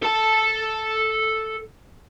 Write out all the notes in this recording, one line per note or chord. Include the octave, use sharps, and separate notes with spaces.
A4 A5